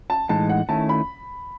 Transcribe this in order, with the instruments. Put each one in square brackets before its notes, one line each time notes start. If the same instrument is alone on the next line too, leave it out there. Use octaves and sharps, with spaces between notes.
[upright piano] A5
[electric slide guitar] A2 E3 G#3 D#4 [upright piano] A5
[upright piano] F#5
[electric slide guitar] D#3 A3 C#4 E4 [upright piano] A5
[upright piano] B5